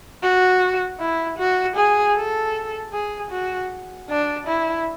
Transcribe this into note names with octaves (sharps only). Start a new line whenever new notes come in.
F#4
E4
F#4
G#4
A4
G#4
F#4
D4
E4